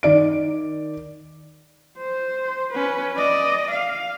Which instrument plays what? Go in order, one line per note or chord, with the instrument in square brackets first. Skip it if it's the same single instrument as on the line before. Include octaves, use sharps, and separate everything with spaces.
[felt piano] D#3 D5 D7
[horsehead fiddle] C5
C#4 B4
D5 D#5
F5